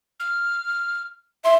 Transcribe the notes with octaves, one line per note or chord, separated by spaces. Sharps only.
F6
E5 C6